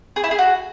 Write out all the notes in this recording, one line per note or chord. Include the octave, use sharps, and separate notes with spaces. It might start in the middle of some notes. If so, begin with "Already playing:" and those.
G#4
E4
G#4
F#4